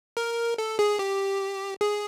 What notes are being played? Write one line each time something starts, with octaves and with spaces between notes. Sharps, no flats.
A#4
A4
G#4
G4
G#4